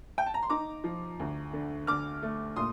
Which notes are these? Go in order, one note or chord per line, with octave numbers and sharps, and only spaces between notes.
G5
A5
A#5
C6
D#4 A#5 D6
F3
D2
D3
D3 D6 F6
A3
A#2 C6 D#6